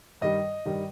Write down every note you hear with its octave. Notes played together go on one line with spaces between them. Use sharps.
G2 D#3 G3 D#5
G2 D#3 G3